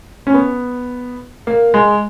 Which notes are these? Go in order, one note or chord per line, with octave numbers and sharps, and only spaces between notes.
C#4
B3
A#3
G#3